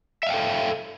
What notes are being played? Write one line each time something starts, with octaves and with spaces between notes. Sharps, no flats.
A4 E5 F5 G5